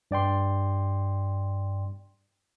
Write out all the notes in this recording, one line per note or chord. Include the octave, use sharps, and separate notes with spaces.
G2 D5 G5 C6